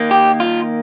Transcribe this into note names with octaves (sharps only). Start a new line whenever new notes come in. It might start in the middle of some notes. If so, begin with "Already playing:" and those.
Already playing: D#3 A#3
G4
F4